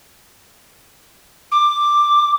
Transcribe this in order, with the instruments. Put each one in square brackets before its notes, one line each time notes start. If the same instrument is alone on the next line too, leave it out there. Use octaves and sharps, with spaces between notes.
[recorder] D6